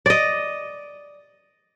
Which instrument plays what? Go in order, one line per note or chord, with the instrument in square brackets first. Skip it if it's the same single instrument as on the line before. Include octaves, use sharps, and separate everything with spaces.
[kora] D5 D#5